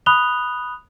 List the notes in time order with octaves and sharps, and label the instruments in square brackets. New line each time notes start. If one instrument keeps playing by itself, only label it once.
[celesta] B5 D#6 F#6 F7 G7